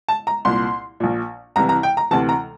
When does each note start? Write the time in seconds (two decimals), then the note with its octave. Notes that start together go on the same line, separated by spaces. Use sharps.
0.08 A5
0.27 A#5
0.45 C2 A#2 C6
1.00 A#1 A#2
1.56 C2 C3 E3 A#5
1.69 A#5
1.83 G5
1.97 A#5
2.11 D2 C3 E3 A5
2.29 A#5